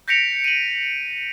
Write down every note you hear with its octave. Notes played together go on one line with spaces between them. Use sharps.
G6 A#6 B6 C#7 D7 F7
D#7 F#7